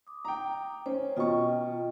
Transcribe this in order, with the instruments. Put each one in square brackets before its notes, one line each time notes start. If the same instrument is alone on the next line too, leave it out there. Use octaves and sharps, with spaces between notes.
[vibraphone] D6 D#6
[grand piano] G5 A#5
[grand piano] C#4 [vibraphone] C5
[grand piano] B2 C#6 [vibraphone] F4 D#5 G5